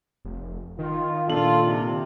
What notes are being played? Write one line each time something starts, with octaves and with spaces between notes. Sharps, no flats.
F1
D#3 F4
A#2 D4 F4 A4 F#7
C3